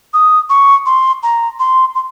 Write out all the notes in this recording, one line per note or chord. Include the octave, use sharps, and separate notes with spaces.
D#6
C#6
C6
A#5
C6
C6